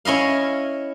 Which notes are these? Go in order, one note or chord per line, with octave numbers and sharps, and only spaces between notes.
C#4 E4 D#5 F5